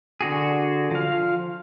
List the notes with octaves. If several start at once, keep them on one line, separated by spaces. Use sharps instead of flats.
D3 F#4 G#4
F3 F5